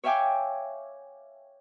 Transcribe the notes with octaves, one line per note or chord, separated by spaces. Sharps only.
C#5 E5 F5 G5 G#5 D6